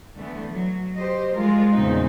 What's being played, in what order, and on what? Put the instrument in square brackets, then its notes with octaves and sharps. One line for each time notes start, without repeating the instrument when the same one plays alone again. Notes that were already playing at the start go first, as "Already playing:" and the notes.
[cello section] D3 E3 A3 B3
F#3
G4 C5 D#5
F3 G3 G#3 F4 A#4
E2 A#2 C#3 C4 D#4